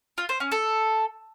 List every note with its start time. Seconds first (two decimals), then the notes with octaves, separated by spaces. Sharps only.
0.18 F4
0.29 C5
0.40 C#4
0.52 A4